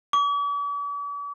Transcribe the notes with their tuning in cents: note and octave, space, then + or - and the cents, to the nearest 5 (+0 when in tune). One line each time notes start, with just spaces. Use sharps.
D6 -45